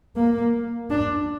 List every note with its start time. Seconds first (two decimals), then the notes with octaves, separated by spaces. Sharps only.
0.16 A#3
0.90 D4